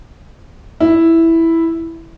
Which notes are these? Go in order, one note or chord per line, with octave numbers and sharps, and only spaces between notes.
E4